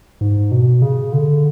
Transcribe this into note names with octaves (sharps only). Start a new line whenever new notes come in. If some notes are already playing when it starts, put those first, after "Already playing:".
G#2
B2
C#3
D3